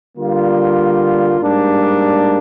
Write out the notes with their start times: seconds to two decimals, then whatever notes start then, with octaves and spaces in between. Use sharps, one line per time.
0.17 D3 G3 A#3 F4
1.40 G#2 G3 A#3 D4